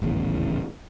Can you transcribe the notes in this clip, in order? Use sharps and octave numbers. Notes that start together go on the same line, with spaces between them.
D#1 A1 E2 C#3